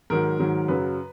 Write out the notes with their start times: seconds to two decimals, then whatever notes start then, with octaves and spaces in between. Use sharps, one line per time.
0.10 G#2 D#3 F#3 A#4
0.39 G#2 D#3 F#3
0.68 F#2 C#3 F#3 B4